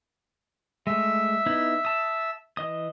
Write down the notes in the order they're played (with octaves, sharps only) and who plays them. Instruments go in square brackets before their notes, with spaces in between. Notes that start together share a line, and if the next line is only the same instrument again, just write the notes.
[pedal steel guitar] G#3 A3 [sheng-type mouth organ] E5
[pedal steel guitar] B3 D#4 E4
A5 D#6
E3 D#5 D#6